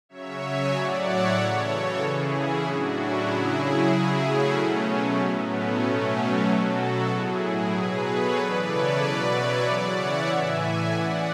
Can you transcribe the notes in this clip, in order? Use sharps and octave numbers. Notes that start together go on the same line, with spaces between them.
C#3 F#3 C#5 E5
E5 G#5
A2 F#3 D5 F#5
C#5 E5
C#3 E3 A4 C#5
F#4 A4
C#3 E3 E4 G#4
C#4 E4
A2 F#3 D4 F#4
C#4 E4
C#3 F#3 E4 G#4
C#3 F#3 E4 G#4
A3 C#4
B2 F#3
A3
A2 F#3 B3
A3 C#4
B2 F#3
B2 F#3 F#4 A4
F#4 A4
A2 F#3 E4 G#4
E4 G#4
B2 F#3 G#4 B4
A4 C#5
C#3 E3 B4 D5
A4 C#5
B2 F#3 B4 D5
C#5 E5
C#3 E3 D5 F#5
C#5 E5
A2 E3 E5 G#5
C#3 E3 D5 F#5